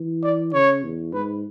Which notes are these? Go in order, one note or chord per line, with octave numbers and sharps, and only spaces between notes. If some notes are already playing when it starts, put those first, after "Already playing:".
Already playing: E3
D5
C#3 C#5
E2
G#2 B4